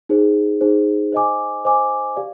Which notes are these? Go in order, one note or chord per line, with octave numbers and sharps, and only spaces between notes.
D#4 G#4 C5
D#4 G#4 C5
C5 D#5 G#5 D6
C5 D#5 G#5 D6
G4 D5 F5